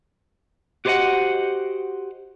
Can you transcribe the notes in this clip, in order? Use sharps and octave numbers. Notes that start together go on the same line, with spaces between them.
F#4 G4 C5 C#5 D#5 F#5